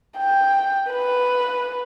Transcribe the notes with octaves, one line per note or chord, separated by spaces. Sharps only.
G5
B4